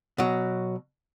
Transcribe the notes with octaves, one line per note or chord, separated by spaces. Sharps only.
B2 F#3